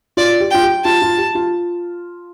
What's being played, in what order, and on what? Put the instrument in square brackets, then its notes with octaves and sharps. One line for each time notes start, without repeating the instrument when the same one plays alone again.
[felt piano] F4 [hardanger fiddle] D5
[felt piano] G4
[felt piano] F4 [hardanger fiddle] G5
[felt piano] G4
[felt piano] F4 [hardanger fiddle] A5
[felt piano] F4
G4
F4